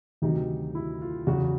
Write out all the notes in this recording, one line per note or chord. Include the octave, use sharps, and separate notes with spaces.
D2 C3 D#3 F#3 D#4
E4
F4
E2 C#3 F#3 F#4